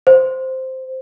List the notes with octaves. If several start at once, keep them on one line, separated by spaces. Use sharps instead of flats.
C5